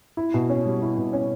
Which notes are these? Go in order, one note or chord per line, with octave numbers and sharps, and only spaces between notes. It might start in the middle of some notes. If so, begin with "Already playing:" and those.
E4
B2
C#4
G3
E4
B2
C#4